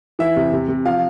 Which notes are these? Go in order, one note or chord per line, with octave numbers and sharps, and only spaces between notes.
E3 E5
C3
C3
C3
F3 F5